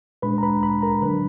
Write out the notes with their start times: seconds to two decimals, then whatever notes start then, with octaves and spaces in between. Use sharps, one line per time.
0.22 A#2 G#3 D4 B4 B5
0.38 A#5
0.43 B4 B5
0.63 B4 B5
0.82 A#4 A#5
1.02 D3 F#3 D4 B4 B5